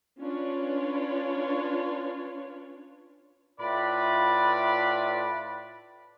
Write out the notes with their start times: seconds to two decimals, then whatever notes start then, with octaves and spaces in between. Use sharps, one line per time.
0.22 C#4 D4 F4 B4 C#5
3.60 A2 F4 B4 D5 B5